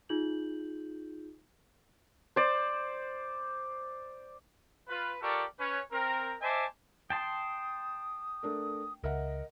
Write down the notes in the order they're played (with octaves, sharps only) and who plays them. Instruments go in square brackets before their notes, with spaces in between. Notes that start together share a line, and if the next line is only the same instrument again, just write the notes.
[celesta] D#4 F4 G#4 G6 F#7
[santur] C5 D5
[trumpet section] F4 B4
F4 G4 A4 A#4 D5 C#6
C#4 B4 C#5
C4 A#4
C5 D#5 E5 G#5 A5 D6
[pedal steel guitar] G5 A5 C6 [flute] D#6
[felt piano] A3 D4 A#4
[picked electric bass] C#2 [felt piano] A#4 E5 F#5 [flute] D#5